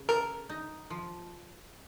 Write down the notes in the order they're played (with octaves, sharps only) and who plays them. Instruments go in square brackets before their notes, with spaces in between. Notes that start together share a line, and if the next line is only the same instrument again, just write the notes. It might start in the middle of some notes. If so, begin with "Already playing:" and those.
Already playing: [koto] C#3
[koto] A4 [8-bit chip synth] A#4
[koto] D#4
F3